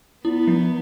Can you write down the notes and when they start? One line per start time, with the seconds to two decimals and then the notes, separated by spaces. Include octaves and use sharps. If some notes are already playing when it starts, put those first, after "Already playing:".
0.25 B3 E4
0.47 F3